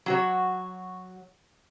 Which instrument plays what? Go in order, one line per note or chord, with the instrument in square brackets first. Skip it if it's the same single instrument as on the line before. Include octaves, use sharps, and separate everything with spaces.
[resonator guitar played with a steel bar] F#3 F#4 C#5